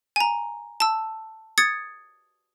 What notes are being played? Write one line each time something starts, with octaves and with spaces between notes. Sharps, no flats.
G#5 A#5
A5 E6
D#6 G#6 A6 C#7